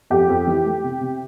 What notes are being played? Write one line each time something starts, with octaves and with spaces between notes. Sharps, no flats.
F2 G4
F2
E3
A3
C3
C3